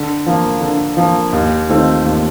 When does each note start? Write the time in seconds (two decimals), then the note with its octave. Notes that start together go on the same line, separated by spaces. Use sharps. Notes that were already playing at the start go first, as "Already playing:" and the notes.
Already playing: D3
0.26 F3 A#3
0.61 D3
0.97 F3 A#3
1.33 D#2
1.69 D#3 A3 C4 F4
2.05 D#2